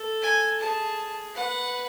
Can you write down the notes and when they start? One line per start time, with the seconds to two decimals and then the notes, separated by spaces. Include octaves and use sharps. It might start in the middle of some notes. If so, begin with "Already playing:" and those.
Already playing: A4
0.22 G#5
0.60 G#4 A5
1.34 B4 F#5